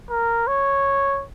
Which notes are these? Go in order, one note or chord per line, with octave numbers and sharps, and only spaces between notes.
A#4
C#5